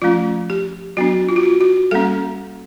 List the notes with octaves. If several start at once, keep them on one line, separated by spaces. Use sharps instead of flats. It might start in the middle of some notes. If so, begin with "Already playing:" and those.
F3 A3 C#4 F4
G4
F#3 B3 D4 F#4
F4
F#4
F4
F#4
G3 A#3 C#4 A4